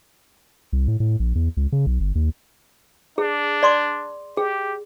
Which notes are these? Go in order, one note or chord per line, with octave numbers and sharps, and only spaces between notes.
C2
A2
A2
A#1
E2
C#2
C#3
B1
G1
D#2
D4 G#4
D5 C6 D6
G4 G#4